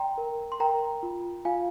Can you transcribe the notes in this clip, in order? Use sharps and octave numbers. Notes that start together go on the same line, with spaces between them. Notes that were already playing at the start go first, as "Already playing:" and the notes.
Already playing: D5 G5 A#5 C6
A#4
C6
A#4 G5 A#5
F4
F4 F5 G#5